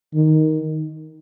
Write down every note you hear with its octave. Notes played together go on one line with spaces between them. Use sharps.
D#3